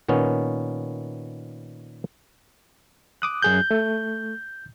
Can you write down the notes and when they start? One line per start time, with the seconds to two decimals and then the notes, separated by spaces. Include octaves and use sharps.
0.08 A#2 D#3 B3 C#4
3.22 D6 D#6 F#6
3.42 F#2 G#4 F#6 G6
3.71 A3